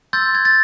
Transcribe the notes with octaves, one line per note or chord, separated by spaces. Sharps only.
C6 E6 G6 A6
G#6
A6